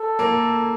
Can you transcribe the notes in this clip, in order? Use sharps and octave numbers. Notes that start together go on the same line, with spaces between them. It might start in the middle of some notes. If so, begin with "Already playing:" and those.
Already playing: A4
A#3